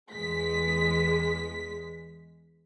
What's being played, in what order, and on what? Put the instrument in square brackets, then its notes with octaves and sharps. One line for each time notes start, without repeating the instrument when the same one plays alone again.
[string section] E2 G#3 B6